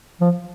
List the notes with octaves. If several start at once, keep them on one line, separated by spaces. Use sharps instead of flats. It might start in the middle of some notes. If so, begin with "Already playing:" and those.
F3